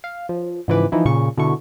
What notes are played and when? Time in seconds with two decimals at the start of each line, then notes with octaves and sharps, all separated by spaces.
0.04 F5
0.29 F3
0.68 G#2 C#3 E3 F3 B4 D6
0.92 E3 F3 D#4 E4
1.05 A#2 C#3 C#6
1.37 B2 D3 E4 C#6